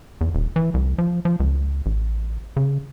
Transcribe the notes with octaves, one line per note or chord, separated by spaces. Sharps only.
E2
D#1
E3
C2
F3
F3
C#2
A1
C#3